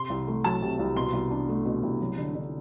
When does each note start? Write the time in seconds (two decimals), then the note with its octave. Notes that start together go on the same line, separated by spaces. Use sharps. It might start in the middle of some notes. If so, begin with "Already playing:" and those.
Already playing: C3 C6
0.10 C2
0.28 A3
0.44 F#3 A5
0.62 C3
0.79 C2
0.96 B2 C6
1.13 C2
1.31 D4
1.49 A3
1.66 B2
1.83 C2
2.01 F#3
2.18 D3
2.35 D3